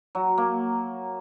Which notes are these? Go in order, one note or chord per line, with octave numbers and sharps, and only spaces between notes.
F#3
A#3